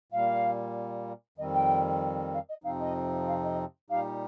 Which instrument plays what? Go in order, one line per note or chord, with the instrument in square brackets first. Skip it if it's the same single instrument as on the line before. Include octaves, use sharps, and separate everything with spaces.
[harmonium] A#2 G3 A#3 [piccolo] F5
[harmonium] F2 D#3 G3 C4 [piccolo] D#5
[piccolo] G5
F5
D#5
[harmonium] F2 C3 F3 C4 D#4 [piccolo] F5
[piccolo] D#5
F5
D#5
[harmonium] A#2 G3 D#4 G4 [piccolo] F5